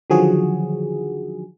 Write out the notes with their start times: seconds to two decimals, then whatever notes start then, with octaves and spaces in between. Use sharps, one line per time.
0.10 D3 D#3 F3 F#3 F#4 G#4